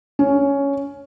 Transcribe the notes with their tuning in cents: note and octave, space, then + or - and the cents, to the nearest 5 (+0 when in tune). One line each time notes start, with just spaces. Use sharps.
C#4 +10